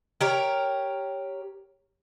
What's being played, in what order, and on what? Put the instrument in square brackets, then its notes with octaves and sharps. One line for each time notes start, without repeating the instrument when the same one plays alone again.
[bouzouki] G4 A#4 C#5